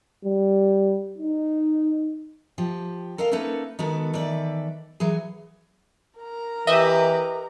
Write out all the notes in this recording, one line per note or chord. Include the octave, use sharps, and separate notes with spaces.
G3
D#4
F3 G4
A4 A#4 D#5 F5
A3 A#3 C#4 D#4 A4 B4
D#3 G#3 B3 F#4 A4
D#3 E3 A4 B4 D5
E3 F#3 G#4
A#4 A#5
E3 G4 B4 D#5 E5